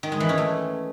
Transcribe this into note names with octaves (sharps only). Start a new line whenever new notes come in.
D#3
G#3
E3
C#4
A3